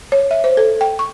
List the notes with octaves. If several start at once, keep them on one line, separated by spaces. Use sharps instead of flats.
C#5
E5
C5
A4
G5
C#6